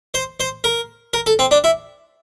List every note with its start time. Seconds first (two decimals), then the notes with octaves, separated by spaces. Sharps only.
0.14 C5
0.40 C5
0.64 A#4
1.13 A#4
1.26 A4
1.39 C4
1.51 D4
1.64 E4